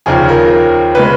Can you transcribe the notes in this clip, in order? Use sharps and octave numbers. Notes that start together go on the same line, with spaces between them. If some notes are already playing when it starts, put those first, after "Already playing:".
D#2 C#3 F3 G#4
A#4
C#3 G#3 B4